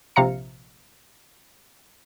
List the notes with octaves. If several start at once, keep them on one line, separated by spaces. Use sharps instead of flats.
A#1 C3 F5 A#5 C#7